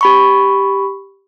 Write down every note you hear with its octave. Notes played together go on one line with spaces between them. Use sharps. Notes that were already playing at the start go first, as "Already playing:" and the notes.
G4 B5 C#6